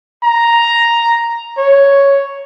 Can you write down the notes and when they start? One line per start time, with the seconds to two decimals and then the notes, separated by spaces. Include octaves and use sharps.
0.24 A#5
1.58 C#5